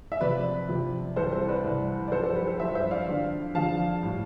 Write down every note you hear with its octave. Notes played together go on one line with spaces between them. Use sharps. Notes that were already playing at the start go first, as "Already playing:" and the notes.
E5
F2 C3 F3 B4 D5
F2 C3 F3
C2 C3 E3 A4 C5
A4 C5
B4 D5
C2 C3 E3
D5
G2 F3 A4 C5
A4
G4 B4
A4 C5
G2 F3 C5 E5
C5 E5
D5 F5
F2 D3 F3
F2 D3 F3 F5 A5
A2 G3